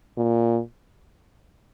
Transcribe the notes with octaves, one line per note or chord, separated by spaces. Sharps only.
A#2